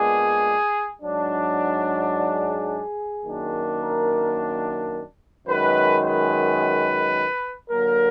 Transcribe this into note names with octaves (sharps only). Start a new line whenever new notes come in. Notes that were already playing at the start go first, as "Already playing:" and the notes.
Already playing: A#2 G#3 B3 D4 G#4
G#2 F#3 D4
G#4
F#2 D#3 A#3 D4
A#4
F#2 D#3 G#3 B4
B4
D3 F#3 A#3 A#4